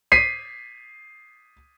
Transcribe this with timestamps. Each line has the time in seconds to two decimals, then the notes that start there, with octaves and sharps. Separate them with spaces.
0.12 B6 C7 D#7